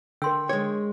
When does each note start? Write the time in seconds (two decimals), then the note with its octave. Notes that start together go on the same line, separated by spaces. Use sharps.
0.22 D3 A#4 G5 C6 E6
0.49 G#3 C#5